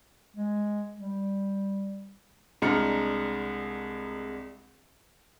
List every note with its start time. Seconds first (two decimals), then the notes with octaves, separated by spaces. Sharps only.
0.36 G#3
0.99 G3
2.62 C2 G#3 D4 A#5 F6 C#7